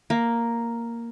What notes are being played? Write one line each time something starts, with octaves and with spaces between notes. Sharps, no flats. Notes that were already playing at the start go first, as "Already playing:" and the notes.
A#3